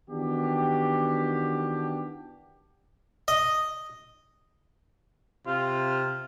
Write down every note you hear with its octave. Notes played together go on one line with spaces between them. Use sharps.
D#3 E3 B3 D4 F#4 G4
D#5
C3 F4